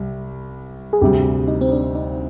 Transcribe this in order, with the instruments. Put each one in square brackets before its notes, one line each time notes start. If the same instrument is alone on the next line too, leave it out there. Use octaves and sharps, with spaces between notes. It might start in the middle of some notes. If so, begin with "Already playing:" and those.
Already playing: [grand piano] C2 C3 G3
[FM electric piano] G#4
[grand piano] D2 C3 G3 [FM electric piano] G4
[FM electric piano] D#4
C4
D4
D#4